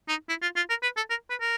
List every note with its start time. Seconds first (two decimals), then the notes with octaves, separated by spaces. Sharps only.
0.09 D#4
0.29 E4
0.42 F4
0.57 F4
0.70 A#4
0.83 B4
0.97 A4
1.10 A#4
1.30 B4
1.41 A#4